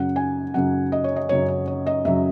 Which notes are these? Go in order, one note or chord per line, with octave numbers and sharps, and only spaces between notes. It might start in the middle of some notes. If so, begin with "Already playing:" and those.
Already playing: F#2 C#3 F#3 F#5
G#5
F#2 C#3 F#3 F#5
D#5
C#5
D#5
F#2 C#3 F#3 C#5
C#5
C#5
D#5
F#2 C#3 F#3 E5